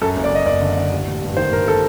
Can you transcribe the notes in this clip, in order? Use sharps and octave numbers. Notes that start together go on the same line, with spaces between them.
F#2 A4
F#1
D5
F#1 D#5
F#1 D5
D3
D3
A1
A1
G2
D#3 C5
G2 A#4
A4